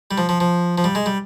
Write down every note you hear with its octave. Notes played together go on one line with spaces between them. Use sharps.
G3
F3
F3
F3
F3
G3
G#3
G3